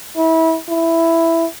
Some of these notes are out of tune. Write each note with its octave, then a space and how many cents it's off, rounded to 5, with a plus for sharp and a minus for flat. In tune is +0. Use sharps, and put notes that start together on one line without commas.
E4 -25
E4 +5